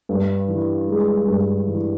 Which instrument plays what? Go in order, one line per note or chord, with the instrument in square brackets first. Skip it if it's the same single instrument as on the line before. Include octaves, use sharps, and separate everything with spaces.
[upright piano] G2
E3
G#3
G2
E3